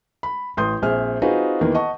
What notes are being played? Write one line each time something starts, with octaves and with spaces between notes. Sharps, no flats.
B5
A1 C6 D#6 G6
A#1 C4 G#4 E5 F6
C4 D#4 F4 F#4 G#4 B4
E2 D#3 E3 A#3 B3
D#5 F#5 A5 C#6